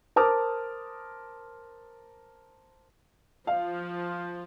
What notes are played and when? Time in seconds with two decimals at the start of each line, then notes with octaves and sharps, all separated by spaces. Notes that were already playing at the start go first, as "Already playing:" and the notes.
0.16 A#4 C5 A5 D6 D#6 F6
3.47 F3 F5